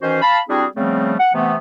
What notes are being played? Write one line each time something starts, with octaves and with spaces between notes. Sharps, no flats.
D#3 E3 C#4 F#4 C5
F5 A5 B5
G3 C4 D4 E4 F#4 G#4
C#3 F3 G3 A3 B3 C4
F#5
C3 E3 A3 B3